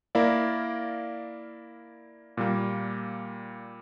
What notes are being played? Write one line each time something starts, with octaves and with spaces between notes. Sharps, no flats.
A#3 E4 A#4 D5 F5
A#2 G3 A#3